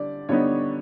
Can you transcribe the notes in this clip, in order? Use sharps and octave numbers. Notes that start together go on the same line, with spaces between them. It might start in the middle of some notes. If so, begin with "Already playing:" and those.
Already playing: D3 G3 D5
D3 G3 B3 D#4 C#5